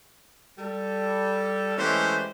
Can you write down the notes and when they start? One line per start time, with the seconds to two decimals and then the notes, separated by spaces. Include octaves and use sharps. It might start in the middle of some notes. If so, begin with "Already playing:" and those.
0.59 G3 A4
1.78 E3 G#3 A3 C#4 G4 C5